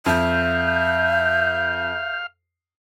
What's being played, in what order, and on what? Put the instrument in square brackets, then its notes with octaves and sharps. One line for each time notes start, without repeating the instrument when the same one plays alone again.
[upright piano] F2 [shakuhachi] E5 [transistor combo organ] F5 [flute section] G6